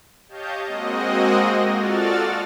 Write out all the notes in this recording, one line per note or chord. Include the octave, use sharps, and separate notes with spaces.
G4 C#5 D#5 F5 A5 G6
G#3 A#3 C4 F#4 D#5
F4 F#4 A4 D5 F6 A6